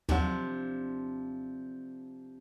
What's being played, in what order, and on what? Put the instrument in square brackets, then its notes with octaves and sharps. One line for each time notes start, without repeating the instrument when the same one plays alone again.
[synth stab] D#2 F#3 [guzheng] C3 F3 D4